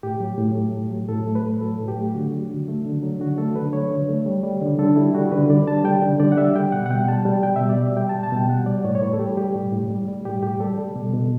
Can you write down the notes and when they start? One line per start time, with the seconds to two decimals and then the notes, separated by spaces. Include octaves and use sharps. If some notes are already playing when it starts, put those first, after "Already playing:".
0.03 A2 G4
0.20 F#3
0.38 A2
0.55 A3
0.74 A2
0.91 F#3
1.09 A2 A4
1.27 A3
1.35 B4
1.44 A2
1.61 F#3 A4
1.79 A2
1.88 G4
1.97 A3
2.14 D3 F#4
2.32 F#3
2.50 D3
2.68 A3
2.86 D3
3.03 F#3
3.20 D3 F#4
3.38 A3 A4
3.55 D3 B4
3.73 F#3 C#5
3.91 D3
4.09 A3
4.26 G3
4.43 G3
4.61 D3
4.79 D3 A4
4.96 G3 E4
5.15 G3 F#4
5.31 D3 B4
5.50 D3 D5
5.67 G3 A5
5.84 G3 G5
6.02 D3
6.20 D3 D5
6.32 F#5
6.37 G3 E5
6.56 G3 G5
6.72 B2 F#5
6.86 F#5
6.90 B2 G5
7.08 G3 A5
7.25 G3 G5
7.43 B2 G5
7.56 E5
7.61 B2
7.69 D5
7.78 G3
7.83 E5
7.97 G3 G5
8.09 A5
8.14 B2
8.23 A5
8.32 B2 G5
8.49 G3 F#5
8.66 G3 D5
8.84 A2 C#5
8.95 C#5
9.02 A2 B4
9.13 A4
9.19 G3 G4
9.37 G3 G4
9.55 A2
9.72 A2
9.91 G3
10.08 G3
10.25 A2 G4
10.43 A2 G4
10.60 G3 A4
10.78 G3
10.96 B2
11.13 B2